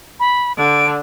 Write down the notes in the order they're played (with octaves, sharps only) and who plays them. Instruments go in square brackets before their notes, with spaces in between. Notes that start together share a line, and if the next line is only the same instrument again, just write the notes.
[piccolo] B5
[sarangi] D3 [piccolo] D7